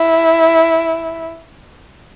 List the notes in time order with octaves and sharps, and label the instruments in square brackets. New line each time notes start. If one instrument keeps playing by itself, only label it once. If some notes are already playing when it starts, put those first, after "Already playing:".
Already playing: [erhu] E4